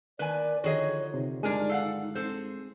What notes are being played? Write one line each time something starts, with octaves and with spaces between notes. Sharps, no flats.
D#3 A#3 B4 D5 G#5
D3 D#3 F3 F#4 G#4 C#5 D#5
C3 D#4
G2 G3 G#3 D4 A#4 G#5
A4 F5 F#5
C4 G#4 A4 C5